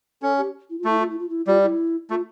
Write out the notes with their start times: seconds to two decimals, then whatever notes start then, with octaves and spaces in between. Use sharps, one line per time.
0.22 C#4 A4
0.38 G4
0.70 E4
0.79 F4
0.85 A3 E4
0.99 F4
1.10 E4
1.19 F4
1.29 E4
1.47 G3 F4
1.63 E4
2.10 A3 F4